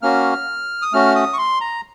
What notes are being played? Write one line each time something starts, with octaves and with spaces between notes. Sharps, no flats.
A#3 C#4 F#4 F6
D#6
A3 C#4 F#4 F6
D#6
C#6
C6
A#5